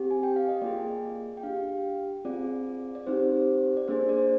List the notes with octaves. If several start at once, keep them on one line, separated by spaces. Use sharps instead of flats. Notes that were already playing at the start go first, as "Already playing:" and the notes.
Already playing: C4 G4
G#5
G5
F5
D#5
A#3 F4 G#4 D5
G5
D4 G4 F5
C4 F4 G#4 D5
D5
C4 D#4 G4 C5
D5
A#3 D4 G#4 C5
D5
C5